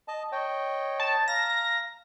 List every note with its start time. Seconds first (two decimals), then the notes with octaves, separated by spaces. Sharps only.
0.08 D#5 A5
0.32 C#5 D#5 G5
1.00 A5
1.28 F5 A#5 A#6